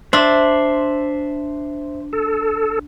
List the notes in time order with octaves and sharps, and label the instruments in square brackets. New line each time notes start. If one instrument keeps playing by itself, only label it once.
[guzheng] D4 [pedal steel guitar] C5 E5
[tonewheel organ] A4